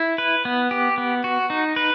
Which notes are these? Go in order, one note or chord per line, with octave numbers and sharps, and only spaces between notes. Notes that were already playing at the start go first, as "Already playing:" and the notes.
Already playing: E4
B4
B3
G4
B3
F#4
D#4
B4